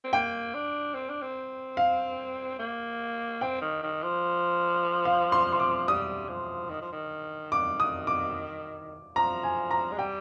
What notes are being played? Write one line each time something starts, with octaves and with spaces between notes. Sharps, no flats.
C4
A#3 G5
D4
C4
D4
C4
F5
A#3
C4 G5
D#3
D#3
F3
F5
C6
C6
D6
G3 D#6
F3
D#3
F3
D#3
D#3 D6
D#6
D6
F3 A#5
G#5
A#5
G#3
G3 G5